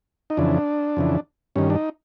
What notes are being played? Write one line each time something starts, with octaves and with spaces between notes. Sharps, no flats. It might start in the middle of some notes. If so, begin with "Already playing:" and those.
D#4
F2 C#3 E3 D4
F2 C#3 E3
G2 D#3 C#4
D4
D#4